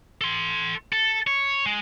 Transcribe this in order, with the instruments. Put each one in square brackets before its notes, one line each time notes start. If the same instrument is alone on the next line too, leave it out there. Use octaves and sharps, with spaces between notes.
[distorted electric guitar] A4 C6
A4
C#5
G#3